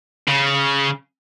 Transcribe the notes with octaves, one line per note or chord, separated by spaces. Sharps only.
C#3